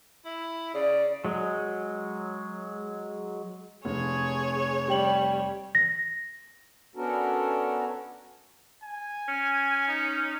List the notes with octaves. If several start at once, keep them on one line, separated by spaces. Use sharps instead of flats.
E4
C#3 D5
F#3 G#3
F1 G#4 C#5
G3 G4 G5 F#7
A#6
B3 C#4 D4 F#4 A4 A#4
G#5
C#4
D#4